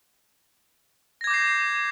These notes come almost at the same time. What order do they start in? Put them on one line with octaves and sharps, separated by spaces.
A#6 G#6 D6 G6 C7